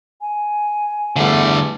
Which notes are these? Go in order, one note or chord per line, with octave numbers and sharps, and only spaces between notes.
G#5
E2 D3 G3 A3